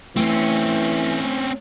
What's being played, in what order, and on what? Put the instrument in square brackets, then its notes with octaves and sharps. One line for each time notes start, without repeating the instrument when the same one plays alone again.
[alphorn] E3 [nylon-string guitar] A3 [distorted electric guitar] C4 C#4